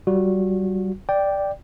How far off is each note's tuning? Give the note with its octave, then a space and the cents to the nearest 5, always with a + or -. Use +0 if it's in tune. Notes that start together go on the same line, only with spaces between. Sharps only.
G3 -30 F#4 -25
D5 +0 G5 +0